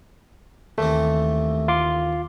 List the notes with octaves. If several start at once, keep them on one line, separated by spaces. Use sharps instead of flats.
D#2 E3 A3 C4
F4 C6 D6